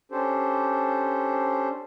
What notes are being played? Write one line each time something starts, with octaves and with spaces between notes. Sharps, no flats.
C#4 D4 G4 A4 C5